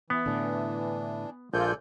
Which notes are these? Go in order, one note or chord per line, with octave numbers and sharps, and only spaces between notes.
E3 B3
A2 D3 D4
A#1 G#3 F4 A4 D5 G#5 G6